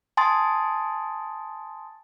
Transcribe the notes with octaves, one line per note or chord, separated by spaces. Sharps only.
G#5 A5 C6 D#6 A6